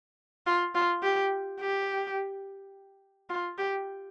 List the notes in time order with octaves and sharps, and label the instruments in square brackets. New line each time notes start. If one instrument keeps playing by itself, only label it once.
[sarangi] F4
F4
G4
G4
F4
G4